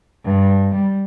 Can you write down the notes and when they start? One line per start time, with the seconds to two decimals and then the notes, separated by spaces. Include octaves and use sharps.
0.24 G2
0.74 G3